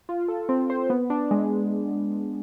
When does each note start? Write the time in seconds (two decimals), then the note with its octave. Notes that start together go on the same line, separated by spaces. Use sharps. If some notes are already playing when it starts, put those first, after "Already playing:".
0.09 F4
0.28 A4
0.49 C4
0.70 C5
0.90 B3
1.10 D4
1.31 G#3